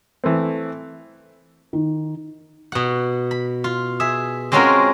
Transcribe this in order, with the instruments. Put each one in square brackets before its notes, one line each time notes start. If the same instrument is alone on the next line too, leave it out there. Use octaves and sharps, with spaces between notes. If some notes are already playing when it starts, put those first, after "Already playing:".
[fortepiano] E3 A3 C4
[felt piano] D#3
[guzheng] B2 F#5
B5
F4
G#4 E5
G#3 C4 C#4 F4 F#4 A#4